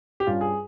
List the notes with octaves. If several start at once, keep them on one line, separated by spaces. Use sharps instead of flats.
G4
G2 G3 C#4 F4
G#4